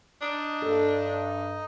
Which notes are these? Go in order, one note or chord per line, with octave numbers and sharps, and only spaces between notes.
D4 D#4 D#5
G2 A4